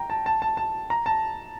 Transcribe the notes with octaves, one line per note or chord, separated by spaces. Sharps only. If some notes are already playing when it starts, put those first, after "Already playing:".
Already playing: G5 A#5
A5
A5
A5
A5
A#5
A5